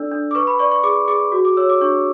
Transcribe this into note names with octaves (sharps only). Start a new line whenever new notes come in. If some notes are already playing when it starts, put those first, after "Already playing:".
Already playing: D4 A4 D5 E6
D4
D6
B4 C#6
B5
D5 C#6
C#6
G#4 D6
G#4 D6
F#4
D6
C#5 E6
D6
D4 C#6